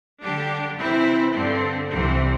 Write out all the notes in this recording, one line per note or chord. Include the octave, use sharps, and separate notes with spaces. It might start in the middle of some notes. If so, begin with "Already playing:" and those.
D3 G3 D4 G4
C3 E3 C4 E4
G2 D3 C4
C2 C3 E3 C4